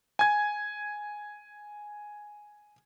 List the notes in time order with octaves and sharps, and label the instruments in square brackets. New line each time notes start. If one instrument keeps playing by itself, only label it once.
[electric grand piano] G#5 G#6